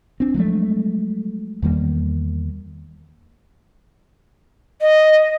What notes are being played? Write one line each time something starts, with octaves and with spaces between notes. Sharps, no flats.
C4 D4
F3 F#3 G#3 A3
E2 D#3 G3 A#3
D#5